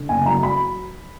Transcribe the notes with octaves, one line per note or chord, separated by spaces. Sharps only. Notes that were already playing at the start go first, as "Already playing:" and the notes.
Already playing: D3
F#1 G#5
F#3 A#5
F#3 B5